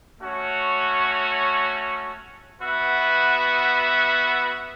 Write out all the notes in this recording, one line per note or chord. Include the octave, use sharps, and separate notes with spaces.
A3 C#4 F#4 C#5
B3 F#4 B4 E5